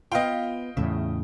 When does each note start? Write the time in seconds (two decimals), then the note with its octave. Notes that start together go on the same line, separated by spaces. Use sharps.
0.12 B3 F4 D#5 F5 G5
0.77 E2 A2 C#3 E5